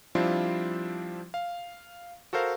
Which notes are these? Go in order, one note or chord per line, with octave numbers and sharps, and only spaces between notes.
F3 G3 C4 D4 E4 F4
F5
F#4 A4 A#4 C5 F5